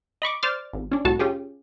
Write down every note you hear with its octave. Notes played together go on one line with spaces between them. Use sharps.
D#5 B5 C#6 D6
C5 D5 D6 F6 A6
G#1
C#4 D4
C2 A2 F#4 A4 A5
C#4 F4 G4 G#4